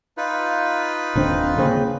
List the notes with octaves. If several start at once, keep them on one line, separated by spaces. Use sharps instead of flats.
D#4 F4 B4
D#1 D3 C4
C#3 A#3 C4